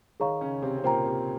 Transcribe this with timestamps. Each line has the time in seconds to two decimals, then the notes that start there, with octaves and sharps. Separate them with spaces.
0.20 D#3 D#4 G#4 C#5 F5 A#5 C#6
0.41 C#3 C#4
0.62 C3 C4
0.78 C4
0.84 A#2 A#3 C5 G5 A#5
1.05 C3 C4